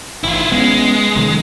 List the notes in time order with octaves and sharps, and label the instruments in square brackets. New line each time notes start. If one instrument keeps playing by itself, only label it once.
[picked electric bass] A1 [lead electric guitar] E4 F4
[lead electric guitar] G#3 [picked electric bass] B3 C#4
[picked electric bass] E1 C3 D#3